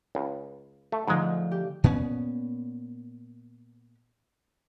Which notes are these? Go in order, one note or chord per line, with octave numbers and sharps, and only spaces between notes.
C#2
A3
G#2 D3 F3 G#3 A3
G4
A#2 B3 C#4